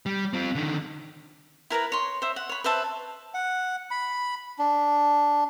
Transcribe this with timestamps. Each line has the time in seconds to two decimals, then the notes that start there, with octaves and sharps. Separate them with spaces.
0.06 G3
0.33 C4 F4
0.55 D3 D#3
1.70 E4 A#4 B4 A#5
1.92 C#5 C6
2.22 C5 E5
2.36 F#5
2.49 C#5 B5
2.64 B4 C5 E5 A5
3.34 F#5
3.91 B5
4.59 D4